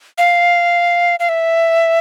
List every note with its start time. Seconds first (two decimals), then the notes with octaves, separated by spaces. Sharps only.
0.18 F5
1.20 F5
1.29 E5